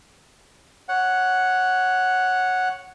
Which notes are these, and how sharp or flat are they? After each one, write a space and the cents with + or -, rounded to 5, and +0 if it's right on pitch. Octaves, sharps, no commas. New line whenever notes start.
C#5 +0 F#5 +0